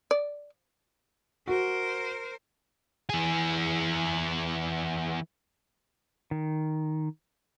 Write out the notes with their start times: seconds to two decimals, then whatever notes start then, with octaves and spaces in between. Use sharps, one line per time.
0.11 D5
1.48 F#4 A#4 C5
3.10 E3 G#4
6.31 D#3